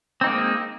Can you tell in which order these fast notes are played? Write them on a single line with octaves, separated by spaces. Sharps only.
C4 D#4 A#3 G#3